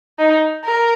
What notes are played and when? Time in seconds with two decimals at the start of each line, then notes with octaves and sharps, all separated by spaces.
0.19 D#4
0.65 A#4